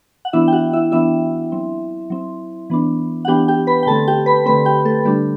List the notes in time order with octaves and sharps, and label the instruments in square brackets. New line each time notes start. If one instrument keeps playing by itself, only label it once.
[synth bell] F#5
E3 B3 D4 E4 E5
G5
F#4 F#5
E4 E5
E3 B3 D4 E4 E5
F#3 C4
F#3 C4
E3 B3 D4
F#5
E3 B3 D4 G4 G5
G4 G5
B4 B5
G5
D3 A3 C4 A4 A5
G4 G5
B4 B5
D3 A3 C4 B4 B5
G4 G5
A3 A4
D3 G3 A3 D4 G4